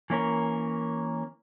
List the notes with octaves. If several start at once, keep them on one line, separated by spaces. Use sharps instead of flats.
E3 A#3 C#4 A#4